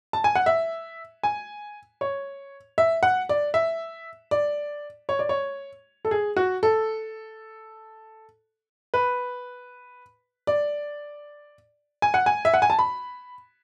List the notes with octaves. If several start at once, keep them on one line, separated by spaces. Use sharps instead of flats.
A5
G#5
F#5
E5
G#5
C#5
E5
F#5
D5
E5
D5
C#5
D5
C#5
A4
G#4
F#4
A4
B4
D5
G#5
F#5
G#5
E5
F#5
G#5
A5
B5